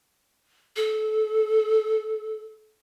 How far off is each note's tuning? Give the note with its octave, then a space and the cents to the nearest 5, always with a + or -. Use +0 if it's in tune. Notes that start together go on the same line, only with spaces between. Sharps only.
A4 -25